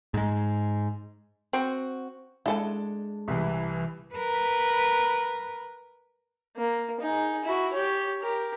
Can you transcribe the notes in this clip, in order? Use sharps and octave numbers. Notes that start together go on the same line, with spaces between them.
G#2 G#3
C4 F#4
G#3 D4 E4 A4 A5
C2 E3
A#4 B4
A#3
D#4 G#4
E4 F#4
G4 C#5
G4 A#4